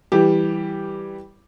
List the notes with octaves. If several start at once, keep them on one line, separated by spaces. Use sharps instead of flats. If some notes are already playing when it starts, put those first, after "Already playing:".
E3 G3 G4